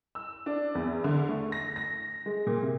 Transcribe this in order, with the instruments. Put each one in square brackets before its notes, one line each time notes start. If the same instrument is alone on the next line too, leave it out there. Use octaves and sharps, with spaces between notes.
[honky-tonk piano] E6
D4
E2
D3
A3
A#6
A#6
G#3
A#2
C3